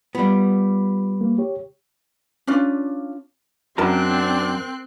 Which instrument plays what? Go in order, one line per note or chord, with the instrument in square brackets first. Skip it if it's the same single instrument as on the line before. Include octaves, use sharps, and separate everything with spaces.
[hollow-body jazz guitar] G3 B3 [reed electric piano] F4
[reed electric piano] A#3
G4 C#5
[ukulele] C#4 D4 F4
[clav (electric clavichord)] F#2 [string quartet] C4 C6 F#6 [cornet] D4 [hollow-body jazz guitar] A#4 A5 A#5